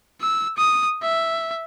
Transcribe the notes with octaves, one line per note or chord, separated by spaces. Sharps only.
E6
D#6
E5